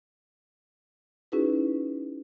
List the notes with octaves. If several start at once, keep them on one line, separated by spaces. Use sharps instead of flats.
C#4 D#4 E4 F#4 G#4 B4